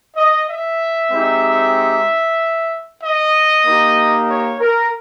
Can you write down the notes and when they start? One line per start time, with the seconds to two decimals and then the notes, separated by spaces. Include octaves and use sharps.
0.16 D#5
0.48 E5
1.11 G#3 C4 D#4 G4
3.02 D#5
3.65 A#3 D#4 G4
4.28 C#5
4.60 A#4